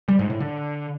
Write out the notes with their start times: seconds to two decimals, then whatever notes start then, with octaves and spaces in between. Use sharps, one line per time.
0.08 G3
0.19 G#2
0.30 A2
0.40 D3